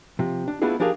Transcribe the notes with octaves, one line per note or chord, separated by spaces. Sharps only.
C3 F3
D4
A3 B3 D4 E4 F4 G#4
F3 D4 G4 G#4 A#4 F5